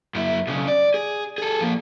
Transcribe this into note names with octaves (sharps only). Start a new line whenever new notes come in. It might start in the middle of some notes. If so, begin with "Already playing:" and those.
F#2 E4
B1 C#3
D5
G#4
G#4 A4
F3 A#3